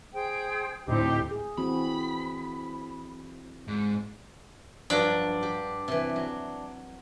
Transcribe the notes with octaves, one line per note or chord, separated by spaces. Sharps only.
G#4 C5 G5
D2 A2 C4 D#4 G4 C5
G#4
E3 C4 F#4 B5
G#2
G2 F3 F#3 D4
G4
C3 E3
F#3